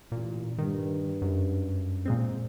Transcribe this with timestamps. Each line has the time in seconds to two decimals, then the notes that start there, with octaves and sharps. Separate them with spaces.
0.12 A1 A#2
0.58 G2 D#3
1.22 F#2
2.06 A#2 G#3 C4